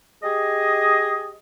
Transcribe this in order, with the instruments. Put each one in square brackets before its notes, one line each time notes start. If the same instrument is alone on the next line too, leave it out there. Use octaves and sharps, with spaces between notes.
[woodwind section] G4 G#4 D#5